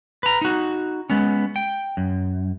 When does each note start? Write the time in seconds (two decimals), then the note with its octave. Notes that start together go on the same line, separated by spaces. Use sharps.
0.23 B4 A#5
0.41 D#4 F#4
1.10 G#3 B3 C#4
1.56 G5
1.97 F#2